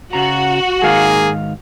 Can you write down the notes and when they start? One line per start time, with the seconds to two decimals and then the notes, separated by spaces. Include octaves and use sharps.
0.13 C#3 F#4 A#5
0.82 G#2 D#3 A#3 G#4 F5